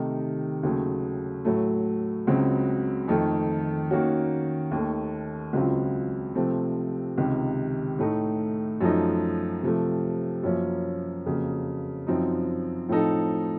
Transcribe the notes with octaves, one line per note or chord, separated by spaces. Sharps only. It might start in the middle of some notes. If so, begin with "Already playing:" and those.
Already playing: C3 D#3 A3 D#4
D#2 C#3 F#3 A3
A2 F#3 A3
C#2 C#3 F#3 C4 F#4
F2 D#3 A3
D#3 A#3 C#4 F#4
D#2 D#3 A3
C#2 C#3 F#3 C4 F4
C3 F3 A3 C4
C#2 C3 D#3
A2 A3 D#4
F#2 F3 A3 D#4
C3 F3 A3
F#2 F3 A#3 C#4
F2 C#3 F#3 A#3
F#2 F3 C4 D#4
A2 F3 C4 D#4 A4